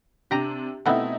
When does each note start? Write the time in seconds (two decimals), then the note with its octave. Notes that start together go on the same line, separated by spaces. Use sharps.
0.31 C3 D4 G4 A#5
0.86 B2 A3 B3 C4 D#4 E4